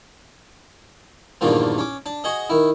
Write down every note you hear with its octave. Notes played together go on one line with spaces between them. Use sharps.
E2 G2 A#2 D3 D#3 F3
C#4 D6
D4
F#4 G#4 D#5
D#3 E4